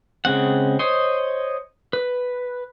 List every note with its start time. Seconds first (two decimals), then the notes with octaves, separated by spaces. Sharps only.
0.25 C#3 G#3 C4 F#5
0.79 C5 C#5 D#5 C6
1.93 B4